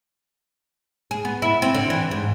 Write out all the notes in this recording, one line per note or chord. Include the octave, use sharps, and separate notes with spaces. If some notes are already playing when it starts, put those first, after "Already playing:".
G#4
B3
E4
C4
D3
E3
G#2